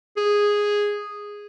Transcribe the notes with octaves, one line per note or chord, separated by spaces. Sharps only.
G#4